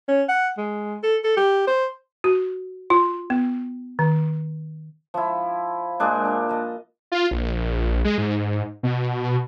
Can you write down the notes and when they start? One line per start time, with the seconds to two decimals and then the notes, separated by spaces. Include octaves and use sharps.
0.08 C#4
0.28 F#5
0.57 G#3
1.03 A4
1.24 A4
1.36 G4
1.67 C5
2.24 F#4
2.90 F4
3.30 B3
3.99 D#3
5.14 F3 E4
6.00 A#2 G#3 D4
6.25 D4
6.49 D#5 A5
7.12 F4
7.31 A#1
8.05 G#3
8.18 G#2
8.83 B2